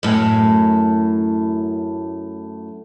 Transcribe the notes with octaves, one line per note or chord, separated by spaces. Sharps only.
F#2 A2